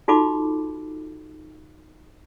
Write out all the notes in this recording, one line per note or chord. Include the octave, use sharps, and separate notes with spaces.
D#4 F4 F#4 A4 B5 D6